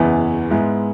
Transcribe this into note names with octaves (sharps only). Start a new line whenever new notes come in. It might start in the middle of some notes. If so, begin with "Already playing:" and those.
Already playing: F#1 E2 E3 B3 E4
G#2 G#3 B3 E4